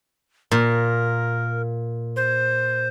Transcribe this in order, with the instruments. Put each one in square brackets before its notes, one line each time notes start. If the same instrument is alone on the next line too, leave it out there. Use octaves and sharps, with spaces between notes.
[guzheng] A#2 [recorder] A#4
[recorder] C5